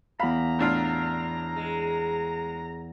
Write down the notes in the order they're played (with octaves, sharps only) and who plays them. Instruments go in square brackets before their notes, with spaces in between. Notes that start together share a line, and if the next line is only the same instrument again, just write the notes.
[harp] E2 F5 [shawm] A#5 [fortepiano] B5
[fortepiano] A2 D4 F4
[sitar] G#3